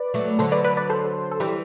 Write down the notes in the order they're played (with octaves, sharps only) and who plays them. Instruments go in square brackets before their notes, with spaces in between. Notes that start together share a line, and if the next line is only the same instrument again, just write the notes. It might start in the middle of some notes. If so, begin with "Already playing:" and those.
Already playing: [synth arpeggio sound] B4 D5
[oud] F#3 A3
[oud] D3 F#3 [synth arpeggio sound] A4 C5
[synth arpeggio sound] B4 D5
B4 D5
B4 D5
A4 C5
A4
[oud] E3 G3 [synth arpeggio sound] G4 B4